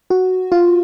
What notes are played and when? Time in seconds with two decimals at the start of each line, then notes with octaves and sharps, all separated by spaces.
0.10 F#4
0.52 F4